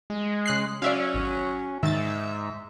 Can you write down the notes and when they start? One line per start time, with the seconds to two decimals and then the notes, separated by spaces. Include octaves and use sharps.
0.10 G#3
0.46 C#3 F#6 C7
0.82 F#3 C#4 D5 E5 F5
1.14 G#1
1.83 G#2 D#3 E5 A6